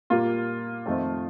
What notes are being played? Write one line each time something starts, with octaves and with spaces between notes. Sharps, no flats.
A#2 G3 A#3 F4
F2 D#3 A3 C4